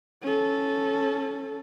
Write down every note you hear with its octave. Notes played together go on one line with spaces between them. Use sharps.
C#4 A4